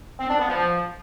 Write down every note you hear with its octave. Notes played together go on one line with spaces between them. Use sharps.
C4
D4
B3
F3